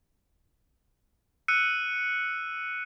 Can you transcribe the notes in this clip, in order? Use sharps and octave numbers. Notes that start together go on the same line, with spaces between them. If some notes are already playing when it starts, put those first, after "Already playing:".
E6 F#6 C#7 D#7